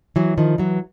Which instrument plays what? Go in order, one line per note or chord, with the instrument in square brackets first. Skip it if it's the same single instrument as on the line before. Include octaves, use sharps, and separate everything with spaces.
[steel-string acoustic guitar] E3 F#3
D#3 F3
E3 F#3